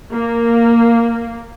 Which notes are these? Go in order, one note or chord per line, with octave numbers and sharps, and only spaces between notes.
A#3